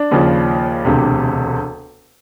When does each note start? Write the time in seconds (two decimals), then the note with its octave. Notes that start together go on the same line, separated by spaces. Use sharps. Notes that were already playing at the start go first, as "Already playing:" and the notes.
Already playing: D4
0.11 D#2 C#3 F3
0.85 E1 D2 C3